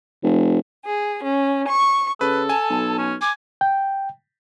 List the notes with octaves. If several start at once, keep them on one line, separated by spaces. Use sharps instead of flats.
F1
G#4
C#4
C#6
C#3 A4 B4
G#5 A5
B1
C#4
G#5 D6
G5